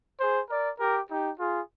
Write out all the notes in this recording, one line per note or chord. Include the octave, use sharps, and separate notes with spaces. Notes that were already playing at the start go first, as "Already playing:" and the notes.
G#4 C5
A#4 D5
G4 A#4
D#4 G4
F4 G#4